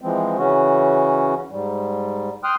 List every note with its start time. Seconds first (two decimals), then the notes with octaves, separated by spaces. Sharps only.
0.01 E3 F3 G#3 C4
0.37 C#3 E3 C#4 F#4
1.50 G#2 G3
2.44 G5 C6 D#6 F6 F#6